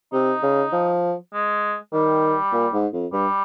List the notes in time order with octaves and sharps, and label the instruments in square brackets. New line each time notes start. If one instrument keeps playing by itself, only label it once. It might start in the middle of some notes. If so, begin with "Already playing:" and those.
[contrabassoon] C3 [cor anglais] D#4
[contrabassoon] C#3
F3
[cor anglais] G#3
[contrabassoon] D#3 [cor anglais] G3
[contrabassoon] A#2
G#2
F2
[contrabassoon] G2 [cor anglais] G3